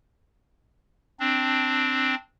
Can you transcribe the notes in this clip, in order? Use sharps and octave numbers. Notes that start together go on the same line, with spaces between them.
C4 D4